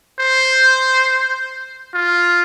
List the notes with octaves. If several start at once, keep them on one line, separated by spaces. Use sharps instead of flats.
C5
F4